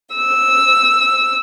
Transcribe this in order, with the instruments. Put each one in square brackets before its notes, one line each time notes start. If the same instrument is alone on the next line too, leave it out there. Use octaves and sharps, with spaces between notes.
[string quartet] E6